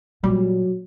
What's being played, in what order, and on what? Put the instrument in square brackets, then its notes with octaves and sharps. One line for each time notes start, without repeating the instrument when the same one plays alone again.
[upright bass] A#2 [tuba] F#3 [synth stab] G3